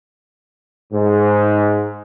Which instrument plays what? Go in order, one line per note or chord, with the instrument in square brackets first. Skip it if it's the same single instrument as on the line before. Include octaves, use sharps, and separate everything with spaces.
[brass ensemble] G#2